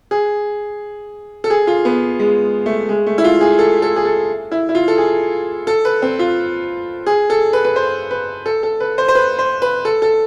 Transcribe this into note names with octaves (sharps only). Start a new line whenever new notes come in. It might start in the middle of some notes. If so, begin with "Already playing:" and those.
G#4
A4
G#4
F4
B3
G#3
A3
G#3
A3
E4
F4
G#4
A4
A4
G#4
A4
E4
E4
F4
A4
G#4
A4
B4
C4
F4
G#4
A4
B4
B4
C5
B4
A4
A4
B4
C5
C5
B4
C5
B4
A4
A4